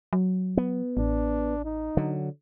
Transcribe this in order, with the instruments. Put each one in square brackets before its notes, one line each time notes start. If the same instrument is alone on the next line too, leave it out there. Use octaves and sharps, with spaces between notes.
[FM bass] F#3
[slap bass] B3
[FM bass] A1 [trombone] D4
[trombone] D#4
[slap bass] D3 F#3